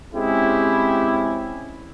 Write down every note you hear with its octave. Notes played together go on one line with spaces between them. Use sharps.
G#3 C4 C#4 E4 G4 G#4